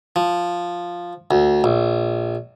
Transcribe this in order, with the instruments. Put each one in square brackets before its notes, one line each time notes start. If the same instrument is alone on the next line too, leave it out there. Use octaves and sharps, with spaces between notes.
[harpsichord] F3
D2
A#1